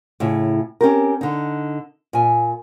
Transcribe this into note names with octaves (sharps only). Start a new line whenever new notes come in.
A2 C#3 E4
C4 C#4 G4 A#4
D3 D#4
A#2 G#5